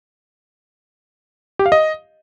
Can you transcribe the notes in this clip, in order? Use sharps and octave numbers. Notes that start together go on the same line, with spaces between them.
G4
F5
D#5